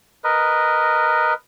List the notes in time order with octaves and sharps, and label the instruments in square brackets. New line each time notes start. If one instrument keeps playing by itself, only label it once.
[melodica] A#4 B4 D#5